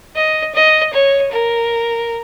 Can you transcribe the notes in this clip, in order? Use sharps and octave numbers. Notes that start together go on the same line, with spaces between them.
D#5
D#5
C#5
A#4